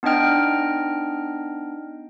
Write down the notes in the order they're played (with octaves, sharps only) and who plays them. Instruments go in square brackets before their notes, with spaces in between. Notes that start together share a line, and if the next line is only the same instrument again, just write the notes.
[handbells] B3 D4 D#4 D#5 G5 F6